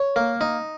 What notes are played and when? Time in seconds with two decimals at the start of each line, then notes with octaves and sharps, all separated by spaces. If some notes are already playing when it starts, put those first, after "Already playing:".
Already playing: C#5
0.16 A#3
0.41 D#4